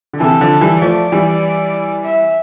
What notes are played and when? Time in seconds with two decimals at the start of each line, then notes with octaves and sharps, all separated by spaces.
0.13 D3
0.20 C3 E3 A4
0.41 D3 F3
0.61 E3 G3
0.82 F3 A3 D5
1.12 E3 G3
2.05 E5